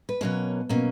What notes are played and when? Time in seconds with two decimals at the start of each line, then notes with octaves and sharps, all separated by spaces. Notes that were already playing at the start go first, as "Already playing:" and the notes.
0.09 B4
0.21 B2 F#3 A#3 C#4 C#5
0.69 B2 F#3 A#3 C#4